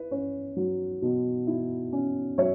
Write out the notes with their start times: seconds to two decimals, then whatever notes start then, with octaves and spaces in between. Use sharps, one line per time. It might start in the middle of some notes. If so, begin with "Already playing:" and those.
Already playing: E4 B4
0.11 C#4 C#5
0.56 F#3
1.02 B2
1.47 E4
1.93 C#4
2.38 F#3 C#5 E5